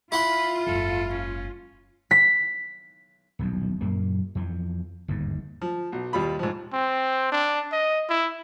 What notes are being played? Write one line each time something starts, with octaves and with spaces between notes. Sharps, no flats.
E4 F4 F#5 B5 C6
F#1 G#2 A4
C#4
B6
D#1 B1 F2
F#2 A#2 A#3
F2 E3 F3
G1 D#2 G#2
F3
B1
D#2 G3 F4 B5
G#2 F3
C4
D4
D#5
E4